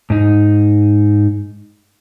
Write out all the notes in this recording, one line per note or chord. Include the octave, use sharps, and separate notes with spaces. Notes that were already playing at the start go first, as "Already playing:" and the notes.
G#2 D#4